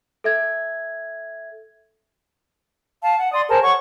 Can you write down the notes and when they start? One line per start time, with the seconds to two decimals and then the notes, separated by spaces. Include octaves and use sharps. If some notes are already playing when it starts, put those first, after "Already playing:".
0.24 A4 E5 G#6
3.02 F5 A5
3.18 F#5
3.32 D5 C6 D#6
3.48 G#4 A#4 C5 A5
3.62 C#5 F#5 C#6